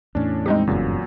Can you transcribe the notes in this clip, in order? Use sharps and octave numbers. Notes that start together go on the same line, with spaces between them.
E2 A2 C#4 D4
G3 G#3 C4 D4 D#4 G4
F#1 E2 G2 A#2 C#3 F#3